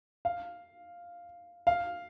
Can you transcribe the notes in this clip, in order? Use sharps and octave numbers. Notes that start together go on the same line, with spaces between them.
F5
F5